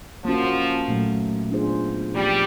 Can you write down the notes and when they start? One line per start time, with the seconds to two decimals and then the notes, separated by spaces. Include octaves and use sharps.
0.25 F3 A#3 C#4 F#4
0.88 A#2 F#3 A3
1.51 B3 D4 F4 G#4 C5
2.15 F3 G3 A#3 D#4 G4